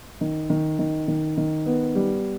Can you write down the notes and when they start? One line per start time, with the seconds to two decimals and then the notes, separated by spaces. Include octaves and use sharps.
0.21 D#3
0.50 D#3
0.79 D#3
1.08 D#3
1.37 D#3
1.66 B3
1.95 G3